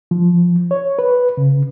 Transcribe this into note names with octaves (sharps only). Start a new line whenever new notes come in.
F3
C#5
B4
C#3